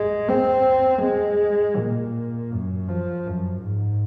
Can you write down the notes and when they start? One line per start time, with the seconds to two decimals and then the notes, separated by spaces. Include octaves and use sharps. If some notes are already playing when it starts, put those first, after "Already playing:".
Already playing: G#3
0.29 C4
1.03 G#3
1.77 A#2
2.51 F#2
2.89 F3
3.27 F#2
3.63 G#2